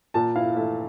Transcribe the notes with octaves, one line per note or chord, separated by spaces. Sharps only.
A#2 A5
E4 F5
A3 E5